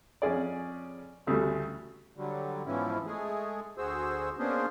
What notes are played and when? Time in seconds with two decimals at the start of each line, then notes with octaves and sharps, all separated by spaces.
0.22 F2 C#4 G#4 D5
1.26 A1 D2 C#3 G3 A3
2.17 D3 F#3 G3
2.66 G#2 B2 E3 F3 C#4 E4
3.06 G#3 A3 G#4
3.78 D2 F#4 G#4 C5 E6
4.39 A#3 B3 C#4 D4 G#4 C5